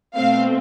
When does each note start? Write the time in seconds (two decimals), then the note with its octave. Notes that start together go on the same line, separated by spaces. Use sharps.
0.15 B2 A3 C4 F5